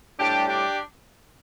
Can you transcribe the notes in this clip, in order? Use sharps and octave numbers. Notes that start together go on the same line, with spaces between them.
A2 G3 D4 G4
D4 G4